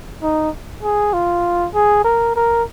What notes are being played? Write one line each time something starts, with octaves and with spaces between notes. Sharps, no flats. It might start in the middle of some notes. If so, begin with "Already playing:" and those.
D#4
G#4
F4
G#4
A#4
A#4